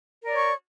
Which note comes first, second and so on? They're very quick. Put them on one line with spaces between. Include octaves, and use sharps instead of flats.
A#4 D5 C#5 C#6